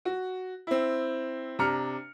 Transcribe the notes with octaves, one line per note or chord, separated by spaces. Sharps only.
F#4
C4 E4
C3 D4 A#5 F6 C#7